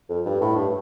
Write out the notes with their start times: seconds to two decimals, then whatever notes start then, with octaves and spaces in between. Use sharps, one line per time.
0.09 F2
0.26 G2
0.41 A2
0.56 G2